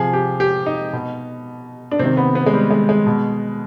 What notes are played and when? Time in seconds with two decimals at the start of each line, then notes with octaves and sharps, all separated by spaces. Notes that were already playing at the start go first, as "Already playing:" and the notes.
Already playing: C3 F3 G#4
0.13 G4
0.40 G4
0.66 D#4
0.93 B2
1.91 D4
1.99 C3 D#3 C4
2.17 B3
2.35 B3
2.46 G#3
2.53 G3
2.70 G#3
2.89 G#3
3.06 B2